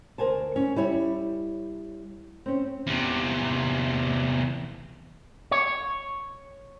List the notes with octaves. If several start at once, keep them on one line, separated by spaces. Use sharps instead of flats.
D2 A#4 C5 G#5 A5
C#4
G3 E4 C#5
C4 C#4
E2 C3
C#5